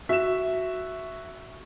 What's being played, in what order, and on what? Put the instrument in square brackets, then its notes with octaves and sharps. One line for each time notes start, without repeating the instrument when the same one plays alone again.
[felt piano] F#4 [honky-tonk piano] E5 E7